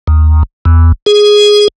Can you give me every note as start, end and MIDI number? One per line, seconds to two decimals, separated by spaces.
0.08 0.43 39
0.65 0.92 40
1.06 1.68 68